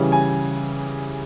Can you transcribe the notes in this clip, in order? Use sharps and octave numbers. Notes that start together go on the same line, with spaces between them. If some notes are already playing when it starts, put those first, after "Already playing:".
Already playing: C#3 E3 G3
G#5